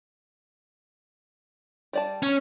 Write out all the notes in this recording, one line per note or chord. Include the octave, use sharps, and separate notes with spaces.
G3 D5 A5
C#4